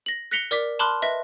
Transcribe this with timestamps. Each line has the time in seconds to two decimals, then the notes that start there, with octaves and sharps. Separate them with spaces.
0.06 A#6 F#7
0.31 F#6 A#6 B6 C#7 F7 G7
0.51 A#4 D5 D6 B6
0.79 A5 B5 C6 D6 F6 F#6
1.02 B4 D#5 E5